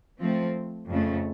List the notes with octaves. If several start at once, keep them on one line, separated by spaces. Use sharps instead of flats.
F3 A3 C4
F2 C#3 A3